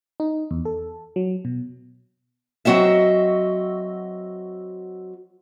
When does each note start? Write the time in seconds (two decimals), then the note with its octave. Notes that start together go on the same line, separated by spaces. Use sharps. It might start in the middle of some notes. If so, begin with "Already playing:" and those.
0.20 D#4
0.51 E2
0.65 A4
1.16 F#3
1.45 B2
2.65 F#3 C4 F#4 D#5 E5